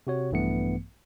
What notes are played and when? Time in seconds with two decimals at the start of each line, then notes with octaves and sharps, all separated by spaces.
0.07 C3 F#4 C#5
0.31 A#1 G2 E3 A3 B3 C#7